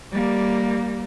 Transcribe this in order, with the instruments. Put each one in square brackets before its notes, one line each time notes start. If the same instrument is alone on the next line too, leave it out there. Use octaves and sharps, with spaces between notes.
[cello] G3 A#3